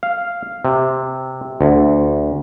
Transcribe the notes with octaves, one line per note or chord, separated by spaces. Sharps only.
F5
C3
D2